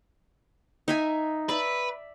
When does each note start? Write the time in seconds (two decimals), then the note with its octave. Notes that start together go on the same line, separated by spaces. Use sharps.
0.88 D#4 E5 G#5
1.49 B4 D5 E5